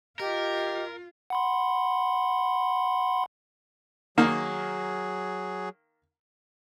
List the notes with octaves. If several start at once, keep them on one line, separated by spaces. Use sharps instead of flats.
F4 G4 A#4 D#5
F#5 B5 C6
D#3 F#3 A#3 G#4